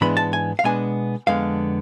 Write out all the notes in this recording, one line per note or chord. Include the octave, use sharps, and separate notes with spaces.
G#2 E3 G#3 B3 D4 B5
A5
G#5
F5
B2 G#3 B3 D4 G#5
F2 D3 G#3 B3 F5